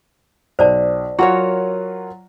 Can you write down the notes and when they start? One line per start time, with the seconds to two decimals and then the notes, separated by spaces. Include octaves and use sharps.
0.59 B1 C5 D5 A5
1.18 F#3 F4 F#4 A#4 C#5 F#5